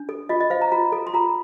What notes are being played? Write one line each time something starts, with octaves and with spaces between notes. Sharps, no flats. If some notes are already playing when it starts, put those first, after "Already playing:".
Already playing: D4
A4
F4 D#5
D#5
C5 F5
A#5
F4 A#5
A4
C6
F4 A#5